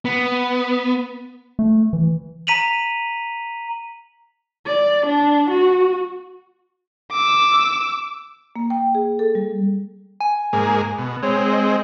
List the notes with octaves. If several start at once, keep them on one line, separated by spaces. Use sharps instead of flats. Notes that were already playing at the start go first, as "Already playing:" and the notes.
B3
A3
E3
A#5 B6 D#7 F7 F#7
D5
D4
F#4
D6 E6
A#3
G5
G#4
A4
G3
G#5
G#2 A#3 G#4
B2
G#3 C4 C#5
D#5